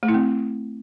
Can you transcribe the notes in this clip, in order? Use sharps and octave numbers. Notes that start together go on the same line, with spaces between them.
A3
E4
C4